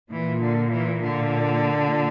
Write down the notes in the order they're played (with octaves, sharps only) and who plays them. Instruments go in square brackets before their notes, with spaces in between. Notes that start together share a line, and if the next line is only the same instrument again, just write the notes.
[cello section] A#2 [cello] E3
[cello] D3
E3
D3